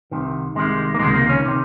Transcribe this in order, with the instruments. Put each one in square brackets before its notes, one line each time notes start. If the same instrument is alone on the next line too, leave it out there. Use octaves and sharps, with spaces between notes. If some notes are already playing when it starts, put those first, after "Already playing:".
[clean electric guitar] C2 C3 D#3
C2 C3 D#3 G#3
A#3
C#2 C3 D#3 G#3
A#3
C#4
C3 D#3